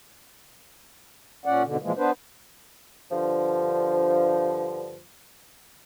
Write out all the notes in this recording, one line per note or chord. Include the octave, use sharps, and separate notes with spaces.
A#2 C#4 D5 F#5
G#2 B2 D3
A#2 E3 F3 G#3 A#3
B3 D4 B4 C5
G2 D3 F3